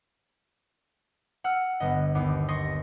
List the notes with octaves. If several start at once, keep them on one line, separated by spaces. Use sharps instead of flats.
F#5 E6 F6
G1 B3 D#5
D#2 B3 D6
D#5 C6 C#6 D#6 A#6